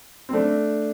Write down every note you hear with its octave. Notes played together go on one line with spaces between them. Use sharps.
C4
A3 D4